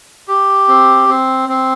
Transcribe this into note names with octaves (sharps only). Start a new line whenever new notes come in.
G4
C4
C4
C4